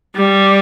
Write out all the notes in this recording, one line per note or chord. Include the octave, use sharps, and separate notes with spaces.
G3